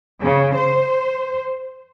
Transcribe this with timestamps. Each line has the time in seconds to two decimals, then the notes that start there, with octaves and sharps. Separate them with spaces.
0.21 C#3
0.54 C5